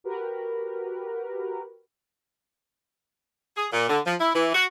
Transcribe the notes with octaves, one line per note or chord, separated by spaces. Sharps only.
F#4 G4 A#4 B4
G#4
A#2
D3
F3
E4
E3
F#4